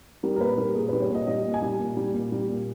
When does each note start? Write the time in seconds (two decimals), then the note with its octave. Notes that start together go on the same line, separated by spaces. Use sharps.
0.23 G3 A#4
0.36 A#4
0.40 A#2 B4
0.58 G3 A#4
0.75 A#2 G#4
0.89 G3 B4
1.02 C#5
1.10 A#2
1.15 D#5
1.27 G3 D#5
1.45 A#2
1.54 G#5
1.62 G3
1.79 A#2
1.97 G3
2.14 A#2
2.32 G3
2.49 A#2